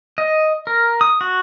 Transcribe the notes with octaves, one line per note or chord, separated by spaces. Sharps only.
D#5
A#4
D#6
F#4